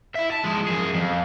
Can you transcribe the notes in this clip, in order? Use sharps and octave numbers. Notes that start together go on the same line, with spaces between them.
E4 E5
A5
F3 G#3
F#2 G#4
F2